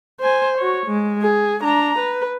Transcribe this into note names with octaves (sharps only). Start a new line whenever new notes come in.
C5 G#5
F#4 C#5
G#3
G#4
D4 A#5
B4